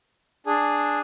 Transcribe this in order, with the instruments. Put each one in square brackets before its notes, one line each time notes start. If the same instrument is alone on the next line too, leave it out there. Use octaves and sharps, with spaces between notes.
[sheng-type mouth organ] D4 G#4